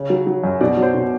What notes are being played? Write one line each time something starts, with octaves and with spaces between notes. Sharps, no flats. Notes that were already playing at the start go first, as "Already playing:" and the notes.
Already playing: C#3
F#3
F#3
F#2
B2 D5
F#3
C5
B2